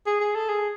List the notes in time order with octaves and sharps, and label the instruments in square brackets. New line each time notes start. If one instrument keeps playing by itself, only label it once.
[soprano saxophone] G#4
G#4
A4
G#4